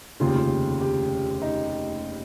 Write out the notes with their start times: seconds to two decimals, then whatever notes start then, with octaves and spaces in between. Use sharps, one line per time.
0.20 F1 D#2 C#3 F4
0.27 G4
0.35 F4
0.81 G4
1.42 D#4